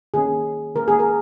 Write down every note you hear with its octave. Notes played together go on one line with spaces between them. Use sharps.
D#3 A#3 C#4 G#4
D#3 A#3 C#4 A#4
G#4
A#4